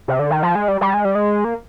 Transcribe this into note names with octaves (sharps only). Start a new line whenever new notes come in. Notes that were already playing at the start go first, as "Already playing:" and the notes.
C3
D3
D#3
F3
G#3
G3
G3
G#3
G3
G#3
A#3